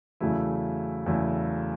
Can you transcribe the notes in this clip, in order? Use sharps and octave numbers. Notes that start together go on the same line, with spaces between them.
E2 C#3 F#3 A3 E4
E2 C#3 F#3 A3 E4